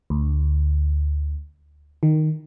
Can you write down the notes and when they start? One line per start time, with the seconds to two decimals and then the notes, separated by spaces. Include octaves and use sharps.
0.10 D2
2.03 D#3